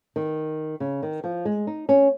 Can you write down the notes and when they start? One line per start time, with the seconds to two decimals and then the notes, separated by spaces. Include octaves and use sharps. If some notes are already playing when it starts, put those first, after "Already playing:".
0.16 D#3
0.80 C#3
1.03 D#3
1.24 F3
1.45 G#3
1.67 D#4
1.89 C#4